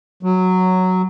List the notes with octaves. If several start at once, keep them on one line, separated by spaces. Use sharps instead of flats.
F#3